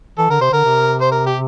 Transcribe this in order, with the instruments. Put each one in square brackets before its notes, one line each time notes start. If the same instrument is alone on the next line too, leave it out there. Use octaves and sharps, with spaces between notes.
[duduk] E3 [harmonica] A4
[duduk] D3 [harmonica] A#4
[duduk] C3 [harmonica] C5
[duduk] D3 [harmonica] A#4
[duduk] C3
[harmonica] C5
A#4
G4